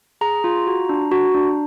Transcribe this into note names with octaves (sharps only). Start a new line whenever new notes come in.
G#4 A#5
F4
F#4
D4
F#4
D4